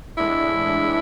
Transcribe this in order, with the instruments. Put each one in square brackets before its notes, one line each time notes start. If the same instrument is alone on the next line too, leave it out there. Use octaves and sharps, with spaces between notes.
[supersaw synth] A2 E3 G#3 D4 [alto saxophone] E4